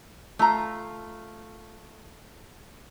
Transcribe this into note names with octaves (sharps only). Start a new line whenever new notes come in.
A3 F4 A#5